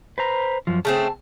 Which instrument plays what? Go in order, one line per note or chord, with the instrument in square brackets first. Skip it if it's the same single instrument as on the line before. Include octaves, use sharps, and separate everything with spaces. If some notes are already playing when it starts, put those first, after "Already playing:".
[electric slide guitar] B4 C5 A#5
F#2 F3
[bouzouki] C#3 A3 C4 [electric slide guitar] A5